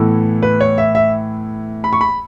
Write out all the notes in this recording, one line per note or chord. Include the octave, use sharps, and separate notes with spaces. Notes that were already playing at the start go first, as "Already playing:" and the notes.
Already playing: A2 E3 B3 E4 A4
B4
C#5
E5
E5
B5
C#6
B5